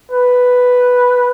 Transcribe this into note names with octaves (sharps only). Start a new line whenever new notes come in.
B4